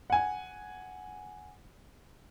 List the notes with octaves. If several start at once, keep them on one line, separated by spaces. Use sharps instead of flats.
F#5 G#5